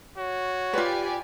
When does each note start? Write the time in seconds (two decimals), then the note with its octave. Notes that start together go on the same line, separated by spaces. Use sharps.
0.18 F#4 C#5
0.73 F4 G4 B4 D5 G#5